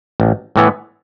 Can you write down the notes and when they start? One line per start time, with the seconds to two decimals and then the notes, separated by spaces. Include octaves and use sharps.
0.20 A1
0.56 A2 E3 B3